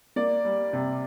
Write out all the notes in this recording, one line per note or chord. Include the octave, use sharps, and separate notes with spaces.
A#3 D5
G3
C3